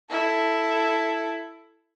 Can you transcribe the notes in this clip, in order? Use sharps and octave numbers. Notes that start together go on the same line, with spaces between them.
E4 A4